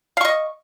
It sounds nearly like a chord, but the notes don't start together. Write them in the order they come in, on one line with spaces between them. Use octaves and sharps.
F5 C#6 D#5